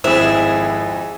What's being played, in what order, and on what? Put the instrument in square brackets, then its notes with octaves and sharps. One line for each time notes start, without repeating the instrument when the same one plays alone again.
[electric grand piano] G#1 E4 [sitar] F2 G#4 [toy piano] C5 [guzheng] E5